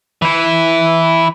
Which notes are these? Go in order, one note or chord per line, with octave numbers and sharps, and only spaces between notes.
E3 E4